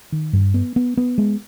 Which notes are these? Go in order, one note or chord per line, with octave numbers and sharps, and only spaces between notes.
D#3
G2
B3
B3
B3
G#3